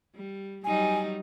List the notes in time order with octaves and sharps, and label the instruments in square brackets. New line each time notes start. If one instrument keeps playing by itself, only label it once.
[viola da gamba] G3
[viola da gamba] F#3 G3 D#4 [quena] G#5